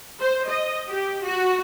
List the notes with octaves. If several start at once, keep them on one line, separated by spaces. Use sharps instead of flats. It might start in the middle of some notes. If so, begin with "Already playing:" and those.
C5
D#5
G4
F#4